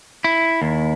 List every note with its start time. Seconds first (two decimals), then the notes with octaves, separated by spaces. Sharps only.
0.24 E4
0.62 D#2